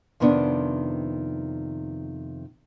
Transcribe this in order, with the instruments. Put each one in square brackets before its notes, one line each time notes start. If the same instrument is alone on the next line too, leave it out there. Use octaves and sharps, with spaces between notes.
[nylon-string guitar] F2 C3 D#3 B3 C#4 D4